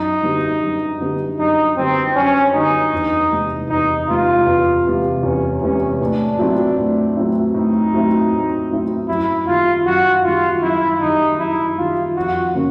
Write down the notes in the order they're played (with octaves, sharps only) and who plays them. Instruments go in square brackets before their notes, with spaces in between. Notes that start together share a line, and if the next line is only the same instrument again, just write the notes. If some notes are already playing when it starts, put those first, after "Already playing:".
Already playing: [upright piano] F#2 [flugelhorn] D#4
[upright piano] D3 G3 B3
F#2
D3 G3 B3
[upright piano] F#2 [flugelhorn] D#4
[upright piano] D3 G3 B3 [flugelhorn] C4
[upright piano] F#2 [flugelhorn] C#4
[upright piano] D3 G3 B3 [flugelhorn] D#4
[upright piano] E2
C3 E3 G#3
[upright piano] E2 [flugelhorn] D#4
[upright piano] C3 E3 G#3 [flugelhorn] F4
[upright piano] E2
C3 E3 G#3
[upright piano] E2 [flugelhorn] C#4
[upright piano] C3 E3 G#3 [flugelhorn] C#4
[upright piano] A2 [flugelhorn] D4
[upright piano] F#3 A3 C4 E4
A2
F#3 A3 C4 E4
[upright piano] A2 [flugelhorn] D#4
[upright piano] F#3 A3 C4 E4
A2
F#3 A3 C4 E4
[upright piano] F#2 [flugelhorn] E4
[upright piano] D#3 G3 [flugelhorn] F4
[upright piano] F#2 [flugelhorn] F#4
[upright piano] D#3 G3 [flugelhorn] F4
[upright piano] F#2 [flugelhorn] E4
[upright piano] D#3 G3 [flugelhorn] D#4
[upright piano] F#2 [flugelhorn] E4
[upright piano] D#3 G3 [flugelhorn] F4
[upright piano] F2 [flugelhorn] F#4
[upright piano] C#3 F#3 A#3 C#4